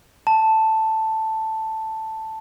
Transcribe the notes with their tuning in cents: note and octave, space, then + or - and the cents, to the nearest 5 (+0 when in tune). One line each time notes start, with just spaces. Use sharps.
A5 +5